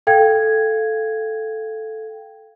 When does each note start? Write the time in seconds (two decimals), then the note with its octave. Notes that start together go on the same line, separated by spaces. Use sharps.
0.07 A4 F5 G5 G#6